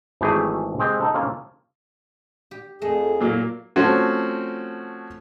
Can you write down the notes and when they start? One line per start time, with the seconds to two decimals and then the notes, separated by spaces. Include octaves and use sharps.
0.21 G#1 E3 F#3 A3 G4 G#4
0.79 G#3 C4 G4
1.01 D#4 A4
1.14 A#3 C4 C#4 F4
2.51 G4
2.82 F2 A3 G#4 D#5
3.20 A#2 F#3 A#3
3.76 F3 A3 C4 C#4 F#4